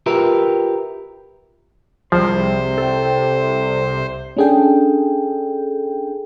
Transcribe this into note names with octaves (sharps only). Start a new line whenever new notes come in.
F4 G4 A#4 B4 E5
C2 C3 F3 G3 G#4 C5
A4 G5
C#4 D4 G#4 A4 G5